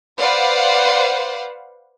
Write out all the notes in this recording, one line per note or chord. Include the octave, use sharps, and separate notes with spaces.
B4 C5 D5 F5 F#5